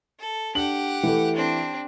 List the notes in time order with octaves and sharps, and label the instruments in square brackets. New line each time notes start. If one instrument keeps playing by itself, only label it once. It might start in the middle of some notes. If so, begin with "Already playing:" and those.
[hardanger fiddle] A4
[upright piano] D4 F#7 [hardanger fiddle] G4 F#5
[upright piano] E3 A3
[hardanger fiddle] C4 D4